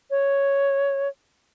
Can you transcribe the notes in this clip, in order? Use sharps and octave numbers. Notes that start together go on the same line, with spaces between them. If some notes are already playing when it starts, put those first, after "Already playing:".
C#5